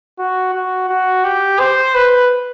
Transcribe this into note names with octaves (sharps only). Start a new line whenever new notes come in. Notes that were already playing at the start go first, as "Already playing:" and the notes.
F#4
F#4
F#4
G4
C5
B4